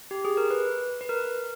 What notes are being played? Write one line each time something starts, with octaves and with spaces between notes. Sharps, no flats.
G4
G#4
A#4
B4
B4
A#4